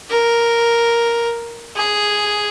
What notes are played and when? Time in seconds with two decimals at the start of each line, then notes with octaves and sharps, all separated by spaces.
0.11 A#4
1.76 G#4